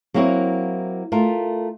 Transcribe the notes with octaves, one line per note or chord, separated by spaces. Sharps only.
F#3 A#3 C4 E4 C#5
A3 F4 A#4